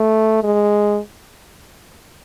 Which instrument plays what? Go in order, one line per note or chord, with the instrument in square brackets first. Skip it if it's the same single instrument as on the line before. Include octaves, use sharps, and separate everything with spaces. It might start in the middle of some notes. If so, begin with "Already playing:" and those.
Already playing: [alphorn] A3
G#3